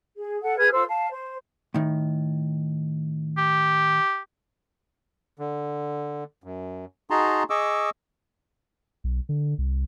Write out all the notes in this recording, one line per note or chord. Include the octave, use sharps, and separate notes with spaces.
G#4
A4 F#5
G#4 B4 F6 G#6
F4 A4 C5 E6
F5 A5
C5
A2 D#3
G4
D3
F#2
D#4 F#4 G#4 A5 A#5 C6
G#4 D#5 C#6 D6 E6
B1
D3
C2